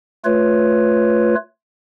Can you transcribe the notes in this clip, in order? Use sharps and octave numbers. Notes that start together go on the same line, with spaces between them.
A3 F4 B4 C#5